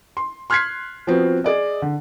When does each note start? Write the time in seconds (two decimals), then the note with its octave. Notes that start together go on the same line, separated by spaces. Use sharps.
0.17 C6
0.50 C6 F6 F#6 G#6 B6 C7
1.07 F3 B3 C4 F#4
1.44 G#4 D5 D#5
1.82 D3